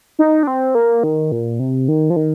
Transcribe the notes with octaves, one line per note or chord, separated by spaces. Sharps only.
D#4
D4
C4
A#3
D#3
A#2
C3
D#3
F3
D#3